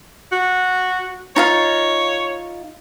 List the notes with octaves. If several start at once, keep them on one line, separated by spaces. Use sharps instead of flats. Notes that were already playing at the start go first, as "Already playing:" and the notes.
F#4
D#4 F4 C#5 F5